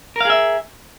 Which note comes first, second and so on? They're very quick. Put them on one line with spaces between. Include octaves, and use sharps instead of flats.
A#4 F5 G#4 E5